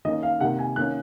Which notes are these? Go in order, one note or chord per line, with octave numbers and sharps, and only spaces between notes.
D#3 A#3 C#4 D#5
F5
C3 D#3 A#3 F#5
G#5
D#3 A#3 C#4 F#6